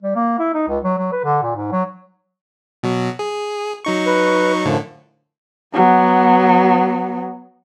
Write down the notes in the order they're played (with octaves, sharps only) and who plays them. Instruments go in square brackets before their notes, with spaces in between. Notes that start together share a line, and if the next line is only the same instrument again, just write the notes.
[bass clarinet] G3
A#3
E4
D#4
C#2
F#3
F#3
B4
D3
A#2
G#2
F#3
[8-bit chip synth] B2 F#3
G#4
F#3 D#4 C#6
[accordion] B4
[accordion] F#2 F3 [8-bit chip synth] A2 D3
[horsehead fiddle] F#3 B3